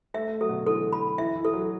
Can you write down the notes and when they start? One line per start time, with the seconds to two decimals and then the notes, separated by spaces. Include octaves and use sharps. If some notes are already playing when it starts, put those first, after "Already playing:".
0.14 A3 E5
0.27 A3
0.41 F#3 A4
0.49 B2
0.53 D3
0.67 E3 A4
0.93 B5
1.18 E3 E5
1.36 E3
1.45 A4
1.53 F#3